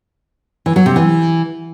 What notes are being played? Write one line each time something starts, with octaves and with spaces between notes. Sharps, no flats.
E3
F#3
C3
E3